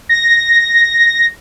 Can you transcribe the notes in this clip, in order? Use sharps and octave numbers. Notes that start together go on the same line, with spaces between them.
A#6